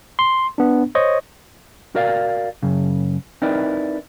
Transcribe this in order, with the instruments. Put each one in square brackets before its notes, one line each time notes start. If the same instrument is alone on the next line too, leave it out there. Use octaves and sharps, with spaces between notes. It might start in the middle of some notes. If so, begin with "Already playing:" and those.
[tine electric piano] C6
B3 D4
C5 C#5 D#5 C#6
[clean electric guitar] F#4 A#4 D5 F5
F#2 C#3
C4 D#4 E4 A#4 B4 D5